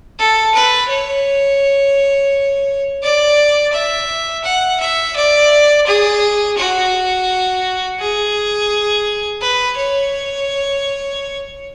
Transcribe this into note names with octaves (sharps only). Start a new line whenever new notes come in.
A4
B4
C#5
D5
E5
F#5
E5
D5
G#4
F#4
G#4
B4
C#5